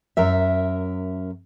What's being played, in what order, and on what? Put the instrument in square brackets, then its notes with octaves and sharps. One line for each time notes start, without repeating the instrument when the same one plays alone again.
[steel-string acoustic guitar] F#2 A#4 E5